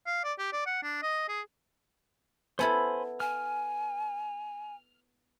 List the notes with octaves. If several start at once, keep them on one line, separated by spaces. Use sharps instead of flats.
F5
D5
G4
D5
F#5
D4
D#5
G#4
B3 E4 A4 C5 G#5 B5
G#5 F6